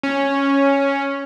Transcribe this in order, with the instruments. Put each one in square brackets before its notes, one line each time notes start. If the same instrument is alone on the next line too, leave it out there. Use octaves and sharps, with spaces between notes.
[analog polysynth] C#4